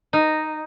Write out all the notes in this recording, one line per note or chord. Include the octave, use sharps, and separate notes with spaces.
D#4